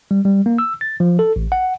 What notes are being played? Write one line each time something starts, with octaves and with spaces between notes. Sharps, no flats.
G3
G3
A#3
E6
A6
F3
A4
A1
F#5